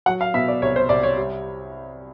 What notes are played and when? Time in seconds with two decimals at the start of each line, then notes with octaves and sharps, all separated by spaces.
0.06 F#3 F#5
0.21 F5
0.34 B2 E5
0.48 D5
0.62 C2 C#5
0.76 C5
0.89 C2 D5
1.03 C#5
1.17 G3